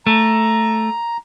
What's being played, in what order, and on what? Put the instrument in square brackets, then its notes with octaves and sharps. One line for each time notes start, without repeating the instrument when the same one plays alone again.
[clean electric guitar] A3 [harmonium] A#5